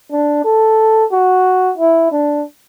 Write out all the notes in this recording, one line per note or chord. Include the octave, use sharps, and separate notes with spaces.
D4
A4
F#4
E4
D4